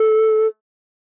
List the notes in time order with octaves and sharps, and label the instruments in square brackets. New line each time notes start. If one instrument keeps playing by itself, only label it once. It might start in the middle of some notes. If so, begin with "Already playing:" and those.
Already playing: [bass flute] A4